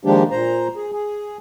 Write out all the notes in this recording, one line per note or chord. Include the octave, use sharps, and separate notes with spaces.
D#3 F3 G#3 A#3 D4 G4
A#2 C5 A#5
G#4
G#4